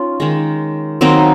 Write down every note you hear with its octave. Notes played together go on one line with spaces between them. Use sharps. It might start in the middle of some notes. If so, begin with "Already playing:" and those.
Already playing: C#4 D#4 F4
D#3 G#3
D#3 F#3 A#3 C4 D#4